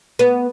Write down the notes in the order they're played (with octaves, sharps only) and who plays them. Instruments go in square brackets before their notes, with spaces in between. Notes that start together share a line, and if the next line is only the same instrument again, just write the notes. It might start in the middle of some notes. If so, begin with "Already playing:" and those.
[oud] B3